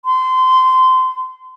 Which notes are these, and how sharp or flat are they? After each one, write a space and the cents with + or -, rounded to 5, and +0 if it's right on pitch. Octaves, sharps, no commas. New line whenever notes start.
C6 -25